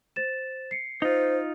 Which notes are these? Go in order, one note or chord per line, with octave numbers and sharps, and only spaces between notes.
C5 A6 E7
C7 C#7
D#4 F4 C5